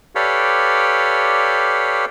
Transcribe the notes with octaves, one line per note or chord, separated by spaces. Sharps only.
G4 A4 B4 C#5 D5 F5